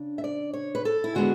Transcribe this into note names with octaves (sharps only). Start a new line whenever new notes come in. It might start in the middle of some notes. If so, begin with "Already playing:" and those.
Already playing: C#3 D4
E5
D5
C#5
B4
A4
E4
D3 G#3 B3 D4 F#4